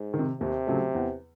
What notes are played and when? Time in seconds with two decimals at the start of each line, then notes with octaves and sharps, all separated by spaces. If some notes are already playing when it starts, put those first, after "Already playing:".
Already playing: G#2
0.14 D#3
0.19 C3
0.41 D#2 C3
0.67 C#3 F#3 A3
0.95 E2